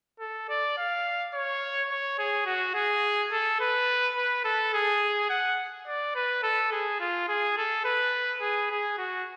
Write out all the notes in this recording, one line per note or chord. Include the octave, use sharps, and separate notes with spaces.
A4
D5
F5
C#5
C#5
G#4
F#4
G#4
A4
B4
B4
A4
G#4
F#5
D5
B4
A4
G#4
F4
G#4
A4
B4
G#4
G#4
F#4